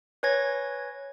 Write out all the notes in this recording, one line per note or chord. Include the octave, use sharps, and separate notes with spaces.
B4 C#5 G#5 G#6 A#6